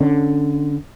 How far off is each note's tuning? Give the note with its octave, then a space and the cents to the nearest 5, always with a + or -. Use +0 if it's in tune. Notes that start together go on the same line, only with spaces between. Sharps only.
D3 +0 C#4 +0